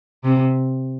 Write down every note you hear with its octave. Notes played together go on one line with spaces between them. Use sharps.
C3